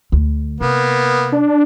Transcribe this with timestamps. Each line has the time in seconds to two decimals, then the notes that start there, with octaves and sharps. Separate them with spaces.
0.12 D2
0.60 C3 A#3 B3
1.32 D4